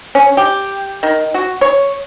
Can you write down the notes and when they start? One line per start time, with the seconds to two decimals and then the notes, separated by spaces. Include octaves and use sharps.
0.15 C#4
0.37 G4
1.03 D#3
1.34 F#4
1.61 C#5